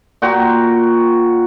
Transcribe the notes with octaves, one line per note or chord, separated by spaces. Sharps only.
A#2 F#4 G5 C6